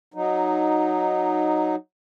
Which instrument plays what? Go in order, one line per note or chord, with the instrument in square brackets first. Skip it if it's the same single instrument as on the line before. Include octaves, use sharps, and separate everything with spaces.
[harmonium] F#3 D#4